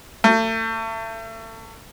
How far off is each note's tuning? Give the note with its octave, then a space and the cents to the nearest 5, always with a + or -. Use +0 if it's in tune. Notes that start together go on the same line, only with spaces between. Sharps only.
A3 +35